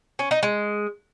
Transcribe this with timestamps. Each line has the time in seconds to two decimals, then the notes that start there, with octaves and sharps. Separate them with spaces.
0.19 C#4
0.31 D#4
0.43 G#3